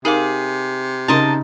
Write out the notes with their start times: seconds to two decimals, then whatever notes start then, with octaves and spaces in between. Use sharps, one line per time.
0.05 C3 D#4 G#4 A#4 F5 D6
1.08 C#3 D#4 A#4 D#5 A5 A#5 C6